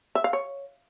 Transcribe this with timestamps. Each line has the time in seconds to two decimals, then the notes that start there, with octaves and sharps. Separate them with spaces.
0.15 E5
0.24 F5
0.33 C#5